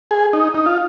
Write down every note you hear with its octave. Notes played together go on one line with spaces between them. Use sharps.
G#4
D#4
D#4
F4